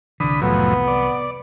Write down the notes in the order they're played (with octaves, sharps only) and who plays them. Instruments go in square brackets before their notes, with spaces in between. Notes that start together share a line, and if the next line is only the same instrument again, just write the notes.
[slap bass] C2 E3 [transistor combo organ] D3 B5 D#6
[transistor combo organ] F2 A2 F#3 [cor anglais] B3
[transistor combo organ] D5